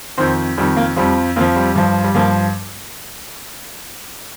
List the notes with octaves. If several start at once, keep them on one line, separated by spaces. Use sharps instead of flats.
F2 D#3 C4
F2 D#3 G3
A#3
F2 F3 G3
F2 F3 A#3
G3
G2 F3
G3
G2 F3 A#3